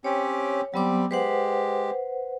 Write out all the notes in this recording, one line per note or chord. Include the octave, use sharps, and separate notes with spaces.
C4 C#4 G4 C#5
F#3 G3 B3 C4 D6
G#3 G4 B4 C5 F#5